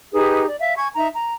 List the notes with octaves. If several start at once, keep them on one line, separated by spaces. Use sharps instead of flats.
D#4 G4 G#4 B4
D5
E5 F5
G#5 C#6 G#6
D#4 E5 A#5
A#5